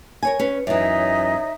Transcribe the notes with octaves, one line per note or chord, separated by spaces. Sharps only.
A#4 C#5 G#5
C#4 B4
F#2 E3 D#4 C#5 E5